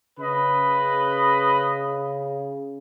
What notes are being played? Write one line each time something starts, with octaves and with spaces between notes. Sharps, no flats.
C#3 B4 D#5 B5